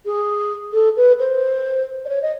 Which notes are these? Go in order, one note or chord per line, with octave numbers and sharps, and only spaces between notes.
G#4
A4
B4
C5
D5
C#5
D#5